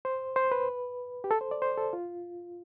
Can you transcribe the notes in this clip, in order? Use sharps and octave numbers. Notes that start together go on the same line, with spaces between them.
C5
C5
B4
G4
A4
C5
D5
C5
A4
F4